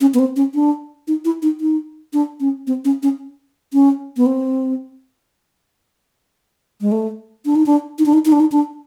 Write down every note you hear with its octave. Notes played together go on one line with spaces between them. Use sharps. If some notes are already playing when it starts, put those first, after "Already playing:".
C#4
B3
C4
C#4
D4
D#4
E4
D#4
D#4
D4
C#4
C4
C#4
C#4
C#4
B3
C4
G#3
A3
D4
D#4
D4
D#4
D4
D#4
D#4
D4
D#4
D4